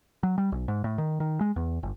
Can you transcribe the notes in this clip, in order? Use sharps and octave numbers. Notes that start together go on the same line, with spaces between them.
F#3
G3
B1
G#2
A2
D#3
D#3
G#3
E2
G1